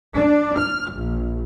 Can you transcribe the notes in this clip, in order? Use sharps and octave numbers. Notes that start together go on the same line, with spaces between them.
D4
F6
A#1